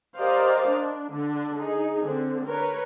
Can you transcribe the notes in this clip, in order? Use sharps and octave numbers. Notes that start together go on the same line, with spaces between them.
G4 A#4 C5 D5 D#5 F5
D4
D3 D4
D#4 G#4
D3 C4
A#4 B4 C#5